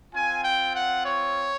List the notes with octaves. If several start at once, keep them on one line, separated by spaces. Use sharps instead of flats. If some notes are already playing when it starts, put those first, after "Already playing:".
C4 F4 G#5
G5
F#5
C#5